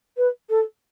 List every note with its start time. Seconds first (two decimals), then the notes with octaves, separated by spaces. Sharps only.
0.17 B4
0.49 A4